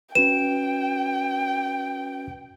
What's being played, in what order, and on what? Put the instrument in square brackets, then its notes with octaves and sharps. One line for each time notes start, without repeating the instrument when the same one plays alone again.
[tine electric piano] C#4 F#4 B4 [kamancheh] G5 [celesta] E7